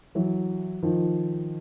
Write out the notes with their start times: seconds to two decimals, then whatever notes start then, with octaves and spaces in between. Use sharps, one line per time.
0.15 E3 F#3
0.83 D#3 F3